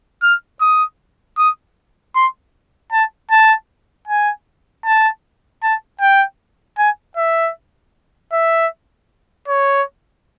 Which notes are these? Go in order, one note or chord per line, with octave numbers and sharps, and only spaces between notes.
F6
D#6
D#6
C6
A5
A5
G#5
A5
A5
G5
G#5
E5
E5
C#5